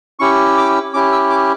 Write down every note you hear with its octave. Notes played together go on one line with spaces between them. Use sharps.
C#4 E4 G4 C#6
D6
C#4 E4 G4 D6
E6
D6